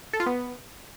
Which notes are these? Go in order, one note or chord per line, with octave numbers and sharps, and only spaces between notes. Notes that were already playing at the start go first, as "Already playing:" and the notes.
A4
F4
B3